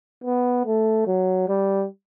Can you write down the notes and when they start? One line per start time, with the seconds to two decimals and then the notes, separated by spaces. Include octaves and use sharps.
0.24 B3
0.66 A3
1.07 F#3
1.48 G3